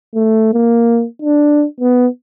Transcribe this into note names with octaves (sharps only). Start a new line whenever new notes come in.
A3
A#3
D4
B3